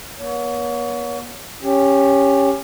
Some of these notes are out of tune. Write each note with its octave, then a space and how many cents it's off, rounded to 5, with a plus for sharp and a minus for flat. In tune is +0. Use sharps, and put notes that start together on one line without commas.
B3 -45 C#5 +30
C#4 +0 G4 +15